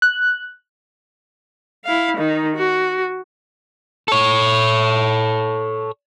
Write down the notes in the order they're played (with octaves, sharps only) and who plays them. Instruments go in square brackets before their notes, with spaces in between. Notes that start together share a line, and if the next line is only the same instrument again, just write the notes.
[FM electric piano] F#6
[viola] E4 F5
D#3 D#4
F#4
[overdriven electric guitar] A4 C#5